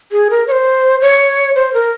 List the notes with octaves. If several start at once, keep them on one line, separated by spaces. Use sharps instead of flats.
G#4
A#4
C#5
C5
C#5
C5
A#4